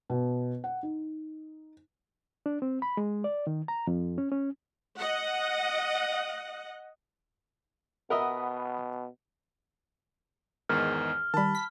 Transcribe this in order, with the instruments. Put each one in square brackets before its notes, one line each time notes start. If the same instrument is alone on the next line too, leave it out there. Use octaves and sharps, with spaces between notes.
[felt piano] B2
F#5
D#4
[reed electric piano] D4
C4
B5
G#3
D5
D#3
A#5
F2
C#4
C#4
[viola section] D#5 F#5
[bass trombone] B2 [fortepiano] A#4 D#5 E5 [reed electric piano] F#5 B5 D#6
[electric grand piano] E2 G#2 D#3 [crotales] F6
[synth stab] D#3 G3 [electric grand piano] A5 B5
[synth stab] B6